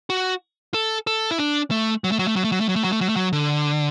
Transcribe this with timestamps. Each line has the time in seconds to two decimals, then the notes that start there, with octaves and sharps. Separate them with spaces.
0.10 F#4
0.74 A4
1.07 A4
1.31 E4
1.38 D4
1.71 A3
2.04 F#3
2.12 A3
2.19 F#3
2.28 A3
2.36 F#3
2.44 A3
2.52 F#3
2.60 A3
2.69 F#3
2.76 A3
2.84 F#3
2.92 A3
3.01 F#3
3.09 A3
3.16 F#3
3.33 D3